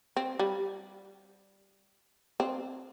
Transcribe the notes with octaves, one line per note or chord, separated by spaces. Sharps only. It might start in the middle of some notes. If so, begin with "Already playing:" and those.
C4
G3
C4